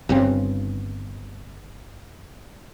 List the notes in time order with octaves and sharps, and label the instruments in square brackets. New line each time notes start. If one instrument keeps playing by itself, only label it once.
[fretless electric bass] G1 G2 C#3 C4